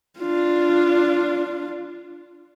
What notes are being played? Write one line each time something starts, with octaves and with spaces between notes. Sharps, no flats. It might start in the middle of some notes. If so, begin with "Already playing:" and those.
D4 F4